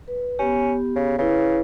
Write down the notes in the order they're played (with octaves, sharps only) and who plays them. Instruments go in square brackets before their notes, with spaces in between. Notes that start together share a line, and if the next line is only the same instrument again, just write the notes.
[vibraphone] B4
[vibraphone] B3 G4 [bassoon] C#4
[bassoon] C#3
[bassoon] C#3 [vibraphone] E4 B4